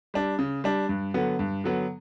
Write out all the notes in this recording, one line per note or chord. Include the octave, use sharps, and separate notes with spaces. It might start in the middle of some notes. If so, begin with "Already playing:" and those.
G3 D4
C#3
G3 D4
G2
D3 F#3 B3
G2
D3 F#3 B3